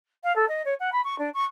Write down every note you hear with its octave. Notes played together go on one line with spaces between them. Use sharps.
F5
A4
D#5
C#5
F#5
B5
C#6
D4
C#6